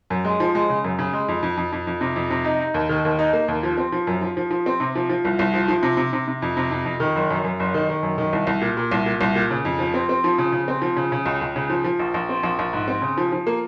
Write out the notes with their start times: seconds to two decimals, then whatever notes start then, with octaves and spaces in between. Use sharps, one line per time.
0.10 F#2
0.25 G#3
0.40 F3
0.55 G#3
0.69 C#3
0.84 F#2
0.99 C#3
1.13 G#3
1.28 F2
1.43 F2
1.57 F2
1.72 F2
1.87 F2
2.01 C3
2.16 F2
2.30 C3
2.45 D#4
2.60 D#4
2.74 D#2
2.89 D#3
3.05 D#2
3.19 D#4
3.33 A#3
3.48 D#2
3.63 F3
3.77 C4
3.92 F3
4.07 F#2
4.21 F3
4.37 F3
4.51 F3
4.66 C4
4.80 C3
4.95 F3
5.09 F3
5.25 C2
5.39 C2
5.54 F3
5.68 F3
5.83 C3
5.97 C3
6.13 C3
6.28 C3
6.42 F2
6.57 C3
6.71 F2
6.85 F2
7.00 D#3
7.16 F#1
7.30 F#2
7.44 F#2
7.60 F#1
7.74 D#3
7.89 D#3
8.03 F#2
8.18 D#3
8.33 C2
8.47 C2
8.61 A#2
8.77 A#2
8.92 C2
9.06 A#2
9.21 C2
9.35 A#2
9.51 C#3
9.65 F2
9.79 F3
9.94 C4
10.09 C4
10.24 F3
10.38 C#3
10.52 C#3
10.68 C4
10.82 F3
10.97 C#3
11.12 C#3
11.26 C#2
11.41 C#2
11.56 C#3
11.70 F3
11.84 F3
12.00 A#1
12.14 A#1
12.29 C4
12.43 A#1
12.59 A#1
12.73 G#2
12.88 C4
13.02 C#3
13.18 F3
13.32 F3
13.47 A#3